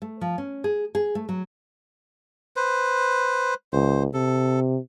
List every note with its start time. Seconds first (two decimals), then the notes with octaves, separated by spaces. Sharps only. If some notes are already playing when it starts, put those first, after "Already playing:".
0.02 A3
0.21 F3
0.38 C#4
0.64 G#4
0.95 G#4
1.15 A3
1.29 F#3
2.56 B4 C5
3.73 C#2 C5
4.13 C3 A4